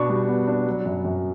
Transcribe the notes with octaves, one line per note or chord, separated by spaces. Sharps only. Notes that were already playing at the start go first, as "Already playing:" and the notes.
Already playing: B2 B3 D4 C#6
G3
B3
D4
F#3
F#2
F#2